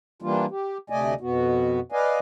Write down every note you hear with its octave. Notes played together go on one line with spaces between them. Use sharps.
E3 G3 A#3 D4 F4
G4
D2 C3 A3 D5 D#5 G#5
F2 B2 B3 F#4
B4 D5 D#5 F5 G#5